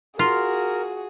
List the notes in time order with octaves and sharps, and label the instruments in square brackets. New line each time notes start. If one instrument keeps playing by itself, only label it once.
[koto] F4 [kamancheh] F#4 G#4 [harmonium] A#4